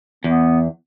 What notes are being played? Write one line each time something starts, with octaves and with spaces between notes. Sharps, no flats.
E2 B3